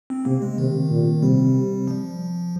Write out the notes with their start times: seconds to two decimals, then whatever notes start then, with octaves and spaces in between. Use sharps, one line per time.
0.10 C4
0.25 C3 A#3
0.42 G#3
0.58 C3 D#3
0.91 A#2
1.22 C3 G3
1.88 F3